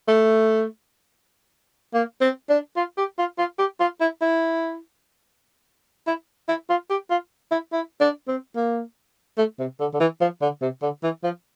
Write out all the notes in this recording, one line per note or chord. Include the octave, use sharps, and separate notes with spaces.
A3
A#3
C4
D4
F4
G4
F4
F4
G4
F4
E4
E4
E4
E4
F4
G4
F4
E4
E4
D4
C4
A#3
A3
C3
D3
D3
E3
F3
D3
C3
D3
E3
F3